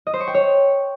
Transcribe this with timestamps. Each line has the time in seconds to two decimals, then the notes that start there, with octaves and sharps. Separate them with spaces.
0.07 D#5
0.14 C5
0.20 C#6
0.27 G5
0.34 C#5